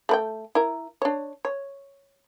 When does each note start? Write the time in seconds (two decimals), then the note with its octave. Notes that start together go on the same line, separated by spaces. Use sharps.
0.09 A3 B4 G5
0.55 E4 A#4
1.02 D4 C#5
1.45 C#5